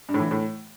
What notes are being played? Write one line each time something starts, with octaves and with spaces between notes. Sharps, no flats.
G2
A2
E3
D3
A2